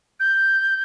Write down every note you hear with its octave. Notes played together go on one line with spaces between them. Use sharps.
G6